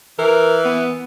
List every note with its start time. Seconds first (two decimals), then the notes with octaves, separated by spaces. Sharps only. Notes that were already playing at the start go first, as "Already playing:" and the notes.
0.19 E3 A#4
0.65 B3